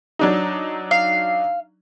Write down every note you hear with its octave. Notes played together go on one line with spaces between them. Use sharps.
F#3 D4 D#4
F5